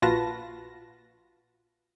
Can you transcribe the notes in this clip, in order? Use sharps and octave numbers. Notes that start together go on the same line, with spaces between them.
A#1 F4 F#4 B4 A5 A#6